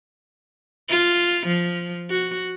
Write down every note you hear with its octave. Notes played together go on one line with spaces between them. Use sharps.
F4
F3
F#4